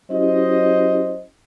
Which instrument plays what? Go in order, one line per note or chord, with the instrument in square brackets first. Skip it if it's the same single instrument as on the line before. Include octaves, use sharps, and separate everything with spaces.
[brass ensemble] F#3 C5 D#5 [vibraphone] C#4 E4 G4